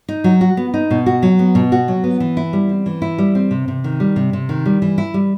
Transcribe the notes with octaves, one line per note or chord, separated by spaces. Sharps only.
D#4
F#3
F#4
B3
D#4
B2
F#4
F#3
B3
B2
F#4
F#3
B3
E3
E4
G3
C4
E3
E4
G3
C4
C3
C3
D#3
G3
C3
C3
D#3
G3
E3
E4
G3